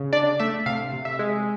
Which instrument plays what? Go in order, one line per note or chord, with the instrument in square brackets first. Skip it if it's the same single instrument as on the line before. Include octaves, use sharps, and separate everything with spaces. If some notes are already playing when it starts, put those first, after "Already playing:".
Already playing: [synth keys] C#3
D4 D5
A3 E5
C3 F5
C3
E5
G#3